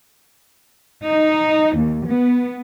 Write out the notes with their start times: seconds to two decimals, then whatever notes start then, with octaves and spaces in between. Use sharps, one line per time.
1.07 D#4
1.77 D#2
2.08 B3